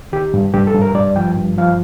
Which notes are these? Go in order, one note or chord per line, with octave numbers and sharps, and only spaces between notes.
D#3 G4
G2
G2 G4
A4
G2
A#4
G2 D5
F3 G5
G2
F3 F5